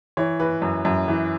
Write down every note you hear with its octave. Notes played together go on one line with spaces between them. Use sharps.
E3 C#5
E3 B4
F#2
F#2
E3